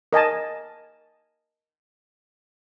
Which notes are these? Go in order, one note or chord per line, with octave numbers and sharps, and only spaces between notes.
A#4 D#5 G#5 A5